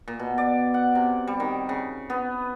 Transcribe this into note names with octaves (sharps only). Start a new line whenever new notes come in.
A#2
B2
D5
F#5
C3
G3
D#3
C#3
B3